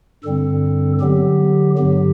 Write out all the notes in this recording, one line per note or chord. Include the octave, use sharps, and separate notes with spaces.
G2 D3 G3 C4 A4
D3 F#3 B3 G4
G2 D3 F#3 G4